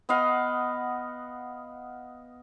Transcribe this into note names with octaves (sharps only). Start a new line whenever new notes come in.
B3 D#5 F5 F#5